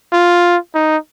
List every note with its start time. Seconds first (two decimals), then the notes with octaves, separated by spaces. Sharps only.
0.13 F4
0.75 D#4